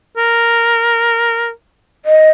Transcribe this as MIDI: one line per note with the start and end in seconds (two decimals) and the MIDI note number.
0.17 1.50 70
2.06 2.31 75